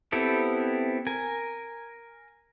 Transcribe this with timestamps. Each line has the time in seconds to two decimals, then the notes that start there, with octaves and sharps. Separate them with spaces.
0.12 B3 C4 E4 G4 A4
1.07 A#4 G#5